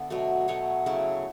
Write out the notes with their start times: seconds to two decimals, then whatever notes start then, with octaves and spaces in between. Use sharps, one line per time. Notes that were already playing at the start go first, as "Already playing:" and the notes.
Already playing: D3 B3 D5 E5
0.10 B2 F#3 A3
0.48 B2 F#3 A3 C#5
0.86 C#3 F#3 A3 E4